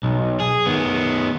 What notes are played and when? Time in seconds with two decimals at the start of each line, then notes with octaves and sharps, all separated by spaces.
0.03 B1
0.40 G#4
0.66 D#3 B3